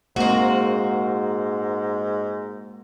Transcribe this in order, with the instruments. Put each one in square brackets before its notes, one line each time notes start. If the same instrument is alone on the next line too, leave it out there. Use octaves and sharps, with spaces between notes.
[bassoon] G#2 [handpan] G#3 A#3 A#4 [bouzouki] C4 F#4